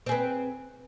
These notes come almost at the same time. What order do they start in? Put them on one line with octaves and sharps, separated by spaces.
C4 G#4 B4